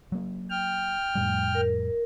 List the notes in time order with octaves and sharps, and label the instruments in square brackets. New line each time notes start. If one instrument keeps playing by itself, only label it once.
[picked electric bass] F#3 A#3
[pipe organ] G5 F6
[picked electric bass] F2 A2 G3
[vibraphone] A#4